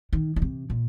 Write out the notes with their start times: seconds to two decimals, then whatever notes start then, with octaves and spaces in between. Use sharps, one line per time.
0.13 D#3
0.36 D#3
0.42 C3
0.70 A#2